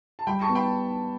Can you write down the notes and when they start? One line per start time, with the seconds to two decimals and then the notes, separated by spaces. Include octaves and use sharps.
0.19 A5
0.27 G3 G5 B5
0.42 A5 C#6
0.49 B3
0.55 G5 B5